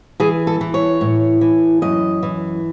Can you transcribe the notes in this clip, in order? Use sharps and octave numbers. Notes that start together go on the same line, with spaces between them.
E3 G#4
A4
E3
C#5
A2
E3
F#2 D#5
E3